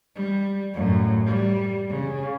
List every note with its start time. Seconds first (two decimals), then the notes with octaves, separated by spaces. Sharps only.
0.15 G3
0.74 F#2 A2
1.26 G3
1.90 C#3